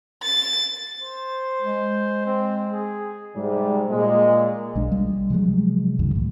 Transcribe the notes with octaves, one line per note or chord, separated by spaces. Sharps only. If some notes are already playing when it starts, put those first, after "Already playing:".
A6
C5
G#3
C4
G#4
G#2 C3 G3
A#2 G#3
B1 G#3 D4
G3
C3 F3 F#3 G#3
C#2 F#2 D#3
A2